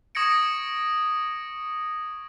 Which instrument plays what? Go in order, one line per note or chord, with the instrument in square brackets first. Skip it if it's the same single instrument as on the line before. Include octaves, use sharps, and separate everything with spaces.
[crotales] C#6 D#6 G#6 A#6 C#7 D7